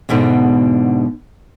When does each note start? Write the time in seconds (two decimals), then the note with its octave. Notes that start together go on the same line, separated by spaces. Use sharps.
0.09 E2 G#2 B2 D3